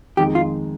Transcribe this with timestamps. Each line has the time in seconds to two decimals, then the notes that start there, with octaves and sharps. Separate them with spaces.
0.17 F2 D#3 G#3 D#4 G4
0.35 F4